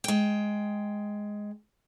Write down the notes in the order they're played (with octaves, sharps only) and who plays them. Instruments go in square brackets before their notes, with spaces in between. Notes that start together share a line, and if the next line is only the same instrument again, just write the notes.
[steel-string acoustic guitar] G#3 G5